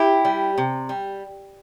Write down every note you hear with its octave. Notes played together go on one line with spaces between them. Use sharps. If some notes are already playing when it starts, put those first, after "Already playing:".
Already playing: E4 G4
G3
C3
G3